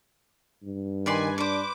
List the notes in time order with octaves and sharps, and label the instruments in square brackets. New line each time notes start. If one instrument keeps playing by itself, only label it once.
[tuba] G2
[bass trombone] D#3 [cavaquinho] B4 D5 C6 [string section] G#5
[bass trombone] D4 [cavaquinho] B4 C5 [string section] D6